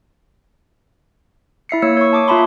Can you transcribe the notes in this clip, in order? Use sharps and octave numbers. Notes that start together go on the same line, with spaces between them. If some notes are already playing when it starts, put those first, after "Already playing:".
E4 E5 C7 C#7
A#3 E4 C#5 E6 C#7
C#5 C#6
A5 D6 D#6
A#3 F4 E5 A5 B5 C6